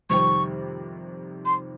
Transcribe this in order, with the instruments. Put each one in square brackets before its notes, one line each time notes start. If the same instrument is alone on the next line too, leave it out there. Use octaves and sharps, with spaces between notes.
[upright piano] F2 C3 D#3 G3 C4 [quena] C#6
[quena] C6